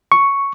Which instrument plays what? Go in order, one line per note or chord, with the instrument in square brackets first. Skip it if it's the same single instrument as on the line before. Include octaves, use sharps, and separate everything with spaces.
[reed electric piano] C#6